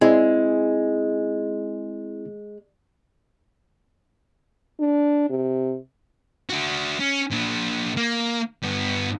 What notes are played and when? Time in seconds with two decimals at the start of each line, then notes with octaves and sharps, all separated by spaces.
0.01 G#3 C4 E4 G#4
4.80 D4
5.29 C3
6.49 D4 F#4
7.00 C#4
7.32 A#2 D4
7.97 A#3
8.63 G2 B3